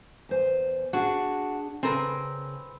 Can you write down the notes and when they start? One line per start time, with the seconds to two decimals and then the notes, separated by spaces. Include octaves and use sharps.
0.29 E2 C5 G#5
0.93 D4 F#4 G#4
1.83 C#3 C4 A#4 B4 G#5